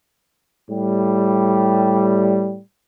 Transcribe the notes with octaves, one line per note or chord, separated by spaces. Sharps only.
A2 G3